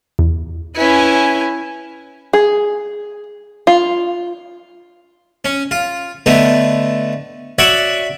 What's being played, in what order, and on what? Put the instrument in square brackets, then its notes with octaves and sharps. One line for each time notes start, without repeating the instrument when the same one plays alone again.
[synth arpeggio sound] E2
[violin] C#4 E4 [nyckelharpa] B4 G#5
[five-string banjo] G#4
F4
[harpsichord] C#4
F4
D3 A3 B3 D#4
F#4 C#5 D5 E5 F#5